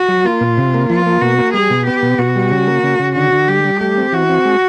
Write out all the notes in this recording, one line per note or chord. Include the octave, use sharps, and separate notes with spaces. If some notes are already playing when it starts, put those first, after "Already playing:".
Already playing: F#4
F#3
A#3 F4
A#2
C3
A#3
F3 F4
A#3
B2 F#4
A#3
G3 G#4
B2
B3 G4
B2
B2 F#4
G3
C#3
A#3
C#3
C#3
D3 F#4
D3
G3 G4
G3
A3 G4
C4
E3 F#4
C4
G#3